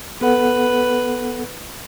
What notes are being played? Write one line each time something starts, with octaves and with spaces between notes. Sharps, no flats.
B3 A4 B4 F#5